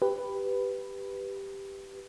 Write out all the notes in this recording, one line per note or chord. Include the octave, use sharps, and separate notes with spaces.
G4 B4